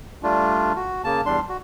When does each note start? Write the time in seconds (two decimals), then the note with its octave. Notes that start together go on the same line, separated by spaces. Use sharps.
0.23 G3 A3 D4 F4
0.76 F#4
1.04 C#3 A#3 A5
1.26 E2 G3 D4 C6
1.49 F#4